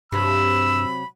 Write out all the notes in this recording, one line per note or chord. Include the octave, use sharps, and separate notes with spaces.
G2 C3 F#3 B5 E6